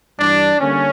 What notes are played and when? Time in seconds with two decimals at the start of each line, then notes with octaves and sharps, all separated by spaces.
0.19 G2 E3 G3 D4
0.60 D3 G3 A#3 C#4